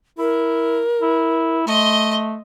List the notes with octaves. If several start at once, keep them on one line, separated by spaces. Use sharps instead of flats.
E4 A#4
E4
A3 D#5 C6